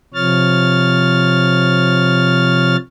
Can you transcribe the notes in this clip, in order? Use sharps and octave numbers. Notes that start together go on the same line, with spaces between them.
C3 F3 C#5 F6 A6